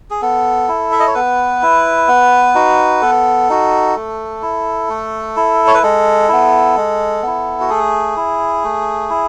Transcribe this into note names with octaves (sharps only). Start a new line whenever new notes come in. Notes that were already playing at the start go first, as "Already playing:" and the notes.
G#4
B3 A4
E4
E5
D#5
C#5
B3 B4
E4
B3
D#4 F#4
B3 A4
D#4 F#4
A3
E4
A3
E4
C#5
B4
G#3 A4
B3 E4
G#3
B3 E4
F#4
A3 G#4
E4
A3
E4